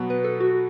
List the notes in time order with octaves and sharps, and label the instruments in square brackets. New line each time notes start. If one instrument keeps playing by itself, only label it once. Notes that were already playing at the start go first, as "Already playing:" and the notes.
Already playing: [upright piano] B2 F#3 B3
[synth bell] B4
A4
F#4